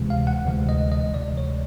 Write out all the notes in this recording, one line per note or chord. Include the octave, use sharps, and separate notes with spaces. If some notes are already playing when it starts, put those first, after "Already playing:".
Already playing: D2 C3 E3 G#3
F5
F#5
D2 C3 E3 G#3
D#5
D#5
D2 C3 E3 G#3 D5
C#5